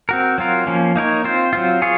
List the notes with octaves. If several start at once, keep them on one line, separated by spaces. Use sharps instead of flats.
C4 F#4 A#4
F#3 C4 F4 A#4
F3 A#3 C#4
A#3 D#4 A#4 C#5
C4 F4 C5
F#3 C4 F4
F4 G#4 C#5